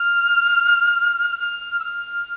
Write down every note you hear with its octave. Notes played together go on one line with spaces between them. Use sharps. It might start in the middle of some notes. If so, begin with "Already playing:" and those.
Already playing: F6
F6
E6
F6